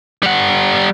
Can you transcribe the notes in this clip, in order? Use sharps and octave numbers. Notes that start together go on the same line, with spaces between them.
G3 F#5